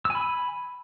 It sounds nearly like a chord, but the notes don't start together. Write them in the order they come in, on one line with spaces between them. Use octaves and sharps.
E6 G#5 B5